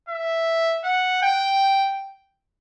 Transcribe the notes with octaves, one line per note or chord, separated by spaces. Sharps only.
E5
F#5
G5